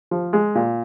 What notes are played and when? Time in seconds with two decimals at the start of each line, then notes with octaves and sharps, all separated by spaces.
0.11 F3
0.33 G#3
0.55 A#2